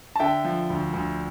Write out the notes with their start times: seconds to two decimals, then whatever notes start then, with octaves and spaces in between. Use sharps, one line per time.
0.16 A5
0.20 D3 E5 G5
0.45 F3
0.70 D2
0.93 D2